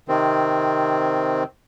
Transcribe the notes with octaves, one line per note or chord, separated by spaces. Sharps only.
C3 D#3 C4